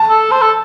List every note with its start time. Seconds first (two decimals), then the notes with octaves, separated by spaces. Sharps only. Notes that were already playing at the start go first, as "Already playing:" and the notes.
Already playing: A5
0.09 A4
0.31 C5
0.41 A4